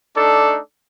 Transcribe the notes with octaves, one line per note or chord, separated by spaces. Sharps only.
A3 D4 D#4 A4 D5